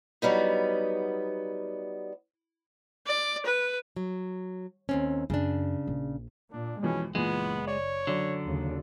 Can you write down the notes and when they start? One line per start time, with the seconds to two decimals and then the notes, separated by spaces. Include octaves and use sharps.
0.22 F#3 G3 B3 D#4
3.07 D5
3.46 B4
3.96 F#3
4.89 D#2 C4 C#4
5.30 F#2 C#3 D4
5.87 A#1
6.52 A#2 D4
6.83 F2 B2 E3 G#3 C#4
7.15 F#1 A#2 E3 G#3 B3
7.67 C#5 D5
8.07 F#2 D3 D5
8.44 D#2 C#3